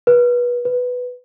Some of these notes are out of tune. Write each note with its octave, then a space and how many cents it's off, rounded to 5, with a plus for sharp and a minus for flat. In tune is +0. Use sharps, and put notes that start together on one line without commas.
B4 -25
B4 +5